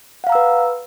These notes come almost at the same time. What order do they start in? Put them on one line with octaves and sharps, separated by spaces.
F#5 F5 A#5 E6 B4